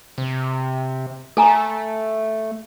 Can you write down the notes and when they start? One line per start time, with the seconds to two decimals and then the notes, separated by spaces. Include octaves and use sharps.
0.18 C3
1.37 A3 A4 G#5 A#5